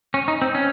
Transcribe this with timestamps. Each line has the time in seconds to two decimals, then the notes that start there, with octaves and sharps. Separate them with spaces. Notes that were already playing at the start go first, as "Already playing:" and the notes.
0.14 C#4
0.28 D#4
0.42 C4
0.55 C#4